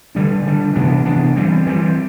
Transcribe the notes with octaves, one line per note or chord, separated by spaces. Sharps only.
D3 G3 D4
D3 G3 D4
C3 E3 B3 D4
C3 E3 B3 D4
E3 G3 C4
E3 G3 C4